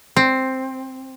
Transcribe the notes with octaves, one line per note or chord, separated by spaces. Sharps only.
C4